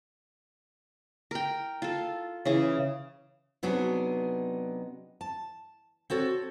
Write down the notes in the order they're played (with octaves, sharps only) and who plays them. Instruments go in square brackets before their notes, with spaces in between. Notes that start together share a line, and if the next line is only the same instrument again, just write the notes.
[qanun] A#4 G5
F4 A4
C#3 E3 G#4
[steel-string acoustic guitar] C3 F#3 B3 D4 D#4 G#4
A5
C4 F#4 A4 C#5